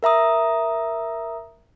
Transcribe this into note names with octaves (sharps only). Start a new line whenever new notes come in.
A#4 E5 A#5 D#6